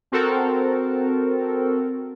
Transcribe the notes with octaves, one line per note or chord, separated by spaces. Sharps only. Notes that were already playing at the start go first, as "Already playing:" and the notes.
C4 F#4 A4 A#4